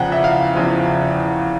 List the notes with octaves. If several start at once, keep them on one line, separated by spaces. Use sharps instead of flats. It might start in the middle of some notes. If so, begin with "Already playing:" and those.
Already playing: E2 C#3 F3 F#5 G5
E5
F5
E2 C#3 F3